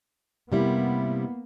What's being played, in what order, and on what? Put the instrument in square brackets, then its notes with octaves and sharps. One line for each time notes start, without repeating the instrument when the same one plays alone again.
[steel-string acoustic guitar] C3 G3 E4 [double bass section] A#3 B3